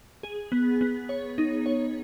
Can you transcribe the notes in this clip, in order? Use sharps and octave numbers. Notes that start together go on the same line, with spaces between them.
G#4
B3
B3
C#5
D#4
C#5